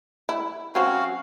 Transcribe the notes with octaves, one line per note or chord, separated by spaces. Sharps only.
E4
F#3 C4 C#4 F#4 F5